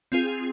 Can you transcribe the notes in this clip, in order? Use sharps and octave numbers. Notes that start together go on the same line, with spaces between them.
C4 F4 G#4